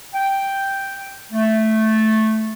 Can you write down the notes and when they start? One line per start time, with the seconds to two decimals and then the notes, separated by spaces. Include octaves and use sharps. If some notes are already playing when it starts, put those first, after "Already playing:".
0.14 G5
1.32 A3